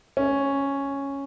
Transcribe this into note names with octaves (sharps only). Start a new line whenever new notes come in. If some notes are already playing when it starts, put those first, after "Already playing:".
C#4